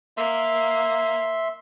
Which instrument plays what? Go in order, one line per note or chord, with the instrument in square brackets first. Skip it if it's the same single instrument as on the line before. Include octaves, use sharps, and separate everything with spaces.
[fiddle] A#3 [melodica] E5 C6